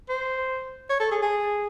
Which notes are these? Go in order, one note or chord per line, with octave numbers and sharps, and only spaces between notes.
C5
C#5
A4
G#4
G#4